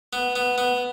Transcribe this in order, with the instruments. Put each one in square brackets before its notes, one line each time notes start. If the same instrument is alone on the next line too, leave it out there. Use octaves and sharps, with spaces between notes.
[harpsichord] B3
B3
B3